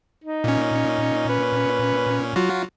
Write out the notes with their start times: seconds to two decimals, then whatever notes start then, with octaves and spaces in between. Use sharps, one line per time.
0.24 D#4
0.44 A#2 C#4
1.29 B4
2.36 F#3 F4 F#4